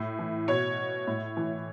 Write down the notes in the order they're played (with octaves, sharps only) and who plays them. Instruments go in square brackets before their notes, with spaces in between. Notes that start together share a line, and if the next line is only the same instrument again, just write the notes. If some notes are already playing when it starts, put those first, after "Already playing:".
Already playing: [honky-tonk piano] A2
E3
B2 C#5
A2
E3